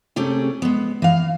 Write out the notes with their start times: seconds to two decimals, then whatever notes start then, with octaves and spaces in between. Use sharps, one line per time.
0.16 C3 A3 C#4 G4 G#4
0.62 G#3 B3
1.02 E3 F5